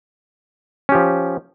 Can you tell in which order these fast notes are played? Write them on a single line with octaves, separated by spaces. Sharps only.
C#4 G4 F3